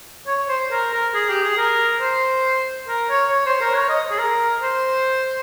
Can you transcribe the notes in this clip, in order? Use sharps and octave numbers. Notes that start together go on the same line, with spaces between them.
C#5
C5
A#4
A#4
G#4
G4
G#4
A#4
C5
A#4
C#5
C#5
C5
A#4
C#5
D#5
G#4
A#4
C5